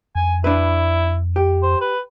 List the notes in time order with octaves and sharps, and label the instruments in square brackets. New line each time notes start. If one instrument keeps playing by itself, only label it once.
[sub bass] F2 [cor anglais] G#5
[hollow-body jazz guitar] D4 B4 [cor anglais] E4
[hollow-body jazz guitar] G4
[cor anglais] C5
B4